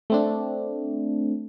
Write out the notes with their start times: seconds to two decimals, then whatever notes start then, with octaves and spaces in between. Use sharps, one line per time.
0.10 A3 C4 D4